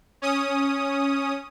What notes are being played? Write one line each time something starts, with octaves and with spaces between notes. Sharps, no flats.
C#4 D#6